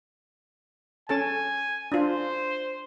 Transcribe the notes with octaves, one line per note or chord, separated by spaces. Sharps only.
C#4 A4 G#5 A5
D4 F4 C5